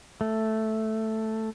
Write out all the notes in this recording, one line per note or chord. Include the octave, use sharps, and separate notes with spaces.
A3